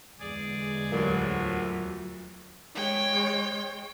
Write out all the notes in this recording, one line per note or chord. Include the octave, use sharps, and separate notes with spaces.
E2 D3 G#3 G#4 D5
D2 A2 E3 F#3 F4 G4 A#4 F5
G#3 C#5 G5